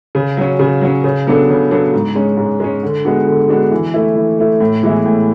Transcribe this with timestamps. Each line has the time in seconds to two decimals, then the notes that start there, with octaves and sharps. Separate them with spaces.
0.15 C#3
0.37 F#3 C#4
0.59 C#3
0.81 F#3 C#4
1.04 C#3
1.27 F#3 B3 D4 A4
1.49 C#3
1.71 F#3 B3 D4 A4
1.93 G#2
2.15 G#3 C#4
2.37 G#2
2.60 G#3 C#4
2.83 D3
3.05 G#3 B3 D4 F#4
3.26 D3
3.49 G#3 B3 D4 F#4
3.71 E3
3.94 A3 E4
4.16 E3
4.38 A3 E4
4.60 A2
4.83 E3 G#3 B3 E4
5.05 A2